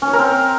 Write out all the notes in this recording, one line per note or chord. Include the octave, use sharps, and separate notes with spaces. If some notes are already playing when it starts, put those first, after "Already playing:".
C#4
C#5
A#4
C4